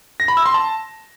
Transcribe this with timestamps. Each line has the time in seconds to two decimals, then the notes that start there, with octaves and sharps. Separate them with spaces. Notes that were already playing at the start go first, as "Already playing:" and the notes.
0.20 A#6
0.28 B5
0.37 E6
0.46 C6
0.54 A5